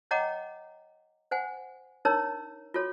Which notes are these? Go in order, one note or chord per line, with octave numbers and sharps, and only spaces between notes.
C#5 D#5 F#5 G5 A#5 D6
C5 F#5 G#5
D4 D#4 A#4 C#5 A#5 E6
F4 F#4 A4 C#5